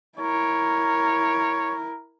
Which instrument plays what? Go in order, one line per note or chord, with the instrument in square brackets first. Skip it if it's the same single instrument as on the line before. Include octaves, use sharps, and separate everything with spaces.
[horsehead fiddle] E4 A#4 [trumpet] C#5